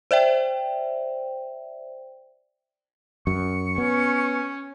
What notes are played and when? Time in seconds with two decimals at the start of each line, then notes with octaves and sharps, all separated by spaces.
0.11 C5 D5 E5 G5
3.27 F#2 C#6
3.78 B3 C#4